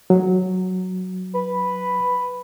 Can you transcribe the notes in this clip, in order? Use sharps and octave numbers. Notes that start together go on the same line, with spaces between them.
F#3
B4